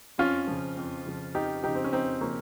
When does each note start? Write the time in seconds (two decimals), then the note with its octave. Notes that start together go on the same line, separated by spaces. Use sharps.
0.18 F2 C#4 F4
0.47 C#3 F3
0.77 F2
1.06 C#3 F3
1.34 F2 D#4 G4
1.63 C#3 F3 D#4 G4
1.75 C4
1.84 C#4
1.92 F2 C4 D#4
2.21 C#3 F3 A#3 C#4